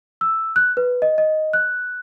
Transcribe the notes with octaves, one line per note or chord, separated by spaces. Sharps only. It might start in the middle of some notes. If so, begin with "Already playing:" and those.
E6
F#6
B4
D#5
D#5
F#6